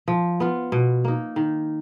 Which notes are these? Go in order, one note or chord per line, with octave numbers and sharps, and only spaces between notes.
F3
B3 F4
B2
A#3 D#4
D#3